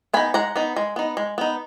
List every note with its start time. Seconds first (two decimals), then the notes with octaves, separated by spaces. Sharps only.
0.13 B3 D#4 G#5 B5
0.34 G#3 F#5 A#5
0.56 B3 D#4
0.76 G#3
0.96 B3 D#4
1.17 G#3
1.38 B3 D#4